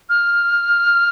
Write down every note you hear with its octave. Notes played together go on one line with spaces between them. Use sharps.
F6